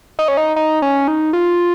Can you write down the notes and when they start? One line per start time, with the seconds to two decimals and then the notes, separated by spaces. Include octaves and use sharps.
0.19 D#4
0.28 C#4
0.37 D#4
0.56 D#4
0.82 C#4
1.08 D#4
1.33 F4